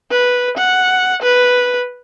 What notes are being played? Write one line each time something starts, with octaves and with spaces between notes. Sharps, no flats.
B4
F#5
B4